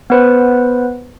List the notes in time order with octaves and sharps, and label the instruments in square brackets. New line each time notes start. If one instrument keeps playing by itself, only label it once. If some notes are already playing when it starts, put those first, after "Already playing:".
[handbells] B3 B4 C5